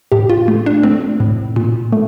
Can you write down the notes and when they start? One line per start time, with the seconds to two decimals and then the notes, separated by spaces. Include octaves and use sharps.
0.12 A2 G4
0.30 F4
0.48 A3
0.66 D4
0.83 A3 C4
1.20 A2
1.56 A#2
1.93 A3